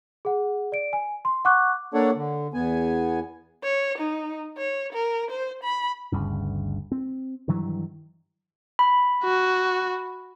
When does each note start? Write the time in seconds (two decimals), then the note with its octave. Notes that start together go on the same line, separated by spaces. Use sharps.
0.25 G#4 F#5
0.72 D5 D7
0.93 G#5
1.25 C6
1.45 F#5 C#6 D6 F#6
1.94 A#3 D4 A4 C#5 D5 F#5
2.15 D3
2.54 E2 B3 G#5
3.63 C#5
3.98 D#4
4.57 C#5
4.93 A#4
5.31 C5
5.63 B5
6.12 G1 D2 G2 C#3
6.92 C4
7.48 G2 D#3 E3 F#3
8.79 B5
9.23 F#4